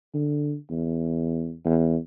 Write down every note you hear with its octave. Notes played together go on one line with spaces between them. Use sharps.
D3
E2
E2